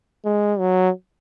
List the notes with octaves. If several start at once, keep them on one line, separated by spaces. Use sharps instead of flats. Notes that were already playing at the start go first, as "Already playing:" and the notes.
G#3
F#3